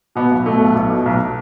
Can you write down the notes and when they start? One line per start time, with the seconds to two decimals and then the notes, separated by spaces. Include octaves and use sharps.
0.15 B2 B3
0.31 B1
0.46 B2 A3
0.61 B1
0.76 B1
0.90 B2
1.06 B1